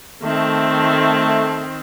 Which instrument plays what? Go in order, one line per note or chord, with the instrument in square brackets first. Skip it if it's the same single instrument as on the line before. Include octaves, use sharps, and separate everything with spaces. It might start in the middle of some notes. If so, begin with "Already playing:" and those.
[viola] D#3 C4 [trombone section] A3